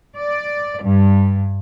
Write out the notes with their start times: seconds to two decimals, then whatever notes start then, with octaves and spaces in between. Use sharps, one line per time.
0.16 D5
0.82 G2